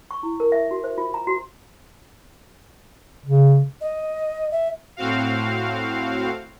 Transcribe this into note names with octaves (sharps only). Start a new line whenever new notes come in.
C#6
E4
A#4
E5
F#4
C5
F4
A#5
F#4
C#3
D#5
E5
A2 C4 F#4 F5